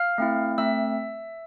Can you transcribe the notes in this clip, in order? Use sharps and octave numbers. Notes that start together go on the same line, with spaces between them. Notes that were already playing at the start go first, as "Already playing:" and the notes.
Already playing: F5 F6
A3 C4 E4
A3 C4 E5 E6